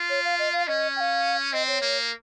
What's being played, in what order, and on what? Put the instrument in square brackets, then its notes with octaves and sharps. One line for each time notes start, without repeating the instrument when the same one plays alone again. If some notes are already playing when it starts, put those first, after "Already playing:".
Already playing: [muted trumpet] F4
[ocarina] C#5
F5
D#5
F5
[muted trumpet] C#4 [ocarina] D#5
[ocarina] G5
F5
[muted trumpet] C4 [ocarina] D#5
[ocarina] C#5
[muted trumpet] A#3